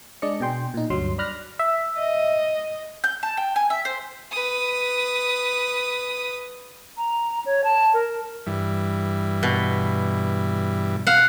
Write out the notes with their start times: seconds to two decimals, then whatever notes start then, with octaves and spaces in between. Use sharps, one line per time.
0.22 G#3 D4 D5 D#5 C#7
0.40 B2 G#4 G5 C6
0.74 A#2 D#4
0.90 D2 G2 F#3 C6
1.18 D5 B5 F6 F#6 A#6
1.59 E5
1.98 D#5
3.04 G6
3.23 A5
3.37 G5
3.56 G#5
3.70 E5
3.85 C5
4.31 B4 D#6
6.97 A#5
7.46 C#5
7.64 A5
7.94 A#4
8.46 G2 E3
9.43 B2
11.07 F5 F#5